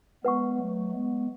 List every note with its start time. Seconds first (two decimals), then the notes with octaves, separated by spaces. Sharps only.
0.24 G#3 B3 B4 F#5 C#6
0.58 F#3 A3
0.91 G#3 B3